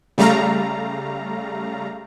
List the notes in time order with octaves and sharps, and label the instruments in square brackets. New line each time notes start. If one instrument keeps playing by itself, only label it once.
[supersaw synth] C#3 G3 A3 F5 A#5